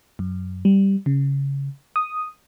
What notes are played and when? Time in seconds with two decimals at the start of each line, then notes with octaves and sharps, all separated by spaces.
0.19 F#2
0.65 G3
1.06 C#3
1.96 D#6